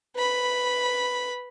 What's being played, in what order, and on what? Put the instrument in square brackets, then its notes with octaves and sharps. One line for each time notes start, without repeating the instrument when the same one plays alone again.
[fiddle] B4 B5